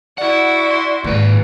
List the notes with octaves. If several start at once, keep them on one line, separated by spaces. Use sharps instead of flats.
E4 F#4 D5 F#5
C6
D#2 G#2 B4